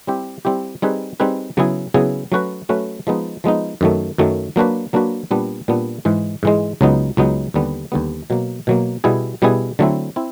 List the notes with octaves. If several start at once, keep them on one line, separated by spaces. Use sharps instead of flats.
G3 C4 E4 G4
G3 C4 E4 G4
G3 C4 D#4 G#4 B4
G3 C4 D#4 G#4 B4
C#3 F#3 B3 E4 G#4
C#3 F#3 B3 E4 G#4
F#3 A3 C#4 F#4 B4
F#3 A3 C#4 F#4 B4
F3 G#3 B3 D#4
F3 G#3 B3 D#4
F#2 D#3 F#3 A3
F#2 D#3 F#3 A3
F#3 A#3 D4 F#4 B4
F#3 A#3 D4 F#4 B4
A#2 G3 B3 D4
A#2 G3 B3 D4
G#2 E3 G#3
G#2 E3 G#3
C#2 C#3 F#3 B3 D#4
C#2 C#3 F#3 B3 D#4
D#2 D3 G3 B3
D#2 D3 G3 B3
B2 F#3 A#3
B2 F#3 A#3
B2 G3 B3 E4 G#4
B2 G3 B3 E4 G#4
D3 F#3 A3 C4 E4
C4 E4